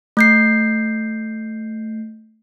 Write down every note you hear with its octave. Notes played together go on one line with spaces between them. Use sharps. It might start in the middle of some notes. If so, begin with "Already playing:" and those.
A3 G6 C7